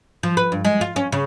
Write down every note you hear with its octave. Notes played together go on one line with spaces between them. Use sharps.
F3
B4
G2
G#3
F4
C#4
C#3